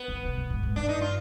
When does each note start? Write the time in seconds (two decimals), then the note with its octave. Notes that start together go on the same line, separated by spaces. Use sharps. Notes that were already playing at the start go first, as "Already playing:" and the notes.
Already playing: B3
0.08 D3
0.25 C3
0.37 B2
0.50 G#2
0.63 G#2
0.76 G2 D4
0.89 D#4
1.01 F4